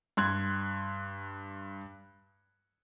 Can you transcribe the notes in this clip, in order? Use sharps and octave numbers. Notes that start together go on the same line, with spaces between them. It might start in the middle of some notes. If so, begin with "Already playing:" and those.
G2 C6 F#6 G#6